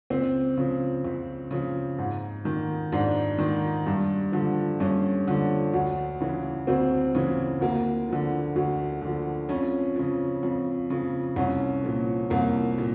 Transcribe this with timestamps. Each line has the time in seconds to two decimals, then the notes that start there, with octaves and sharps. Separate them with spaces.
0.10 C#2 C4
0.57 C#3 F3
1.05 C#2
1.51 C#3 F3
1.98 G#2
2.45 D#3
2.92 G#2 D4
3.39 D#3
3.87 G2
4.32 D3 F3
4.80 G2 C#4
5.27 D3 F3
5.74 D2
6.20 C#3 E3
6.67 D2 C4
7.15 C#3 E3
7.61 D2 A#3
8.09 D3 F3
8.56 D2
9.02 D3 F3
9.49 F2 C#4
9.95 C#3 F3
10.43 F2
10.90 C#3 F3
11.36 C2 C#4
11.84 A#2 F3
12.30 C2 A#3
12.78 A#2